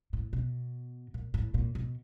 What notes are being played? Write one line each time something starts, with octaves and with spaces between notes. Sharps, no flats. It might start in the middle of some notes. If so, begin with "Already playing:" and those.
A2
B2
A#2
A2
A#2
B2